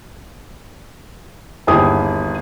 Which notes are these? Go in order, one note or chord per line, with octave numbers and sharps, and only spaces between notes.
G1 D#2 E4 G4 G#4 D#6